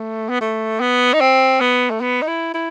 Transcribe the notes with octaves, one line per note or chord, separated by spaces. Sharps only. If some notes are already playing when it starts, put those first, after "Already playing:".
Already playing: A3
B3
A3
B3
D#4
C4
B3
A3
B3
D#4
E4
E4